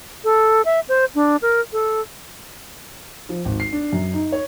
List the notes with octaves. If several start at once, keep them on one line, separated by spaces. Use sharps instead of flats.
A4
E5
C5
D4
A#4
A4
F3
G#1
C7
D4
F#2
D#4
C#5